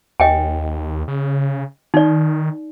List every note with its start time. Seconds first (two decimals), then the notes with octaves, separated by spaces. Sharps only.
0.20 D#2 D#5 G5 G#5
1.08 C#3
1.94 D#3 D#4 D5